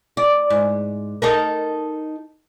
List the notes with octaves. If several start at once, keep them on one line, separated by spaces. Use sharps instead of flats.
D5
G#2
D#4 A4 A#4